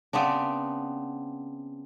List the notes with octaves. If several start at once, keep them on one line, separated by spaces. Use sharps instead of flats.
C#3 B3 C4 D4